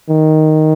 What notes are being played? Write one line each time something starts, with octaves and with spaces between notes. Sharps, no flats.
D#3